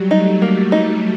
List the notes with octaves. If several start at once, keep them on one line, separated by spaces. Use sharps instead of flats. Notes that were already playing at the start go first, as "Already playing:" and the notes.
Already playing: F#3 G3
A3 D#4
A#3
D#4